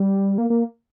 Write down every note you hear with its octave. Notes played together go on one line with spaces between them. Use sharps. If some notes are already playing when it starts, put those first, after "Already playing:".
Already playing: G3
A#3
A#3